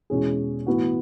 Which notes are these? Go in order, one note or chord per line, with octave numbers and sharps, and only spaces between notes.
E2 B2 G#3 C#4 G#4
A2 E3 B3 F#4